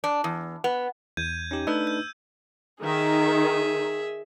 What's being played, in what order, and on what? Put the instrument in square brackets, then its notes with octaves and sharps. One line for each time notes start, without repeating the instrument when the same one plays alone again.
[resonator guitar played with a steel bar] D4
E2
B3
[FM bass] E2 [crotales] G6 G#6 D#7
[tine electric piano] C#4 D#4 G4
[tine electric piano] A3 D4 B4 [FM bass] D#4 [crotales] E6
[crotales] G6
[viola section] D#3 [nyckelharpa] G#4 E5